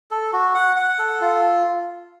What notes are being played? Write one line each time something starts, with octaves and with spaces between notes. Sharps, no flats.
A4
F#4
F#5
F#5
A4
F4